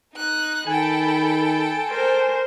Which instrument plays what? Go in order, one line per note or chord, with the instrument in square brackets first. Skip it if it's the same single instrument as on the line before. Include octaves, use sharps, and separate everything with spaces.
[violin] D#4 F#6
[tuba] D#3 [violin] A4 G5 [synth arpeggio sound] G#5 [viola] B5
[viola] A#4 C5